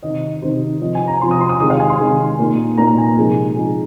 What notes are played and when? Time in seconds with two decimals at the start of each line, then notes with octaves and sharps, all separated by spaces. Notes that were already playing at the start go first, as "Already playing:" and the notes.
0.03 C3 D#3 C4 D#4 D#5
0.42 C3 D#3 C4 D#4 C5
0.81 C3 F3 C4 D#5
0.95 G#5
1.07 A#5
1.21 C3 F3 C4 C6
1.31 D#6
1.41 C6
1.49 D#6
1.60 C3 D#3 G#3 D#6
1.70 F5
1.80 G#5
1.89 C6
2.00 C3 D#3 G#3
2.39 A#2 A#3 D#4
2.77 A#2 A#3 D#4 A#5
2.98 G#5
3.17 C3 F3 G#3 D#4
3.56 C3 F3 G#3 D#4